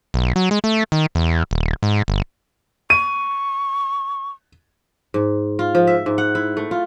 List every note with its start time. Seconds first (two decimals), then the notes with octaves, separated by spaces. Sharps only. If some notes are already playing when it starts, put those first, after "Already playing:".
0.14 B1
0.36 F#3
0.51 G#3
0.64 A3
0.92 D#3
1.15 E2
1.51 D#1
1.83 G#2
2.08 G1
2.90 C#6 D#7
5.14 G#2
5.59 F4
5.75 F3
5.87 E5
6.06 G#2
6.18 F#5
6.35 E4
6.57 A3
6.71 F4